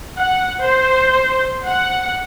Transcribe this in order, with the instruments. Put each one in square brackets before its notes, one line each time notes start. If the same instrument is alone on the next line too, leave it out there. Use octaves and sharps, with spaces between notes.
[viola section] F#5
C5
F#5